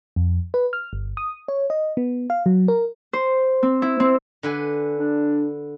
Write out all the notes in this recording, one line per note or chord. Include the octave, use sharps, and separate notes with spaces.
F2
B4
F6
G1
D#6
C#5
D#5
B3
F5
F#3
A#4
C5
C4
E4
C4
D3 B4 G#5
D4